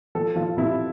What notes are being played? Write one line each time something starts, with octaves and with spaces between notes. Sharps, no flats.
F3 A4
F3 F4
C3 E4